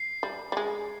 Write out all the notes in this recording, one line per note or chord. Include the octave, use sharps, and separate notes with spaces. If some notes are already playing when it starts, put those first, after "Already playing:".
Already playing: C7
G3
G3
G#3